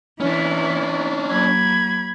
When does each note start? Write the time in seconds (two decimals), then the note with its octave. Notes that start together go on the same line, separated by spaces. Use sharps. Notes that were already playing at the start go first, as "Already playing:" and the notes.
0.20 E3 C#4 D4 E4
1.31 F#3 A#3 B5 G#6